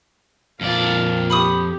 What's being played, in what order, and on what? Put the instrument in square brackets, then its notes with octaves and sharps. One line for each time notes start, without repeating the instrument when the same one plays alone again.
[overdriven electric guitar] F2 D5 [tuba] A#2 [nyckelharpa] F5 A5
[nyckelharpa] G4 [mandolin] B5 C#6 D#6